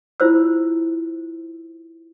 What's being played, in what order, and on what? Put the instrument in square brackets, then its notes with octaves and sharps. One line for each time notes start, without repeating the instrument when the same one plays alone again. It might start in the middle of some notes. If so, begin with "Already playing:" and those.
[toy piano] E4 F4 C5 E6